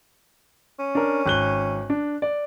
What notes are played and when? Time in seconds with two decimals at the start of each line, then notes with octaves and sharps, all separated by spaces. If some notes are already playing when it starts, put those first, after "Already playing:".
0.79 C#4
0.95 D4 A#4
1.26 G#1 F#6 G7
1.90 D4
2.22 D5